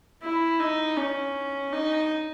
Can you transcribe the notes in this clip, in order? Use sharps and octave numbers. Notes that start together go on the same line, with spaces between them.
E4
D#4
C#4
D#4